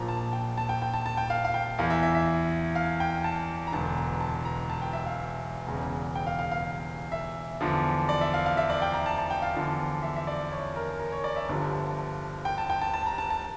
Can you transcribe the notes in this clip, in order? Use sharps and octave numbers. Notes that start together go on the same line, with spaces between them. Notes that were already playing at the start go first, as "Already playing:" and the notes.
Already playing: A#1 A#2 F3 A#5
A5
G5
A5
G5
G5
A5
A5
G5
F5
F5
G5
E2 E3 F5
E5
E5
E5
F5
G5
A5
A#5
E1 E2 D3 A5
A#5
A5
A#5
A5
G5
E5
F5
E1 E2 C#3
G5
F5
F5
F5
E5
E2 D3 F3
D5
E5
F5
F5
E5
D5
G5
A#5
A5
A5
G5
F5
E2 D3 F3
E5
E5
D5
C#5
A#4
A#4
C#5
D5
E5
G1 G2 D3 F3
G5
A5
G5
A5
A5
A#5
A5
A5